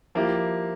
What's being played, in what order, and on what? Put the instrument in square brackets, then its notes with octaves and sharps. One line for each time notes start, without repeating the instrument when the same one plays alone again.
[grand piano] F3 A#3 E4 G4